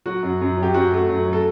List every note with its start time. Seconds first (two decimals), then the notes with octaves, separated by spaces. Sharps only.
0.06 F#3 F#4
0.23 F#2
0.41 F#2
0.57 F#3
0.63 G4
0.74 F#2 F#4
0.92 A3
1.09 F#2
1.26 F#3
1.33 A4